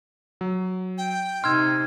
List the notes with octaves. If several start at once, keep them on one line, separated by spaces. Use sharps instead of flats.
F#3
G5
C3 D#4 C6 E6 F6 G#6